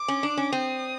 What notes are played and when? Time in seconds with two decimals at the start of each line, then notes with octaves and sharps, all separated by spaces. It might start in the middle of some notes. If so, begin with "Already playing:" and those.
Already playing: D6
0.08 C#4
0.23 D4
0.37 C#4
0.52 C4 D#6